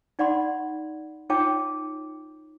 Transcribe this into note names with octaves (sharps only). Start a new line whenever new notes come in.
D#4 D5 F#5 B5 C6
D#4 F4 C#5 G5 A5 D6